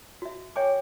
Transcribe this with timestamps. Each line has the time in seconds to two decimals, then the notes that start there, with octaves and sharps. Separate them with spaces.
0.22 F#4 E5
0.56 C#5 E5 G5 G#5 C#6 D6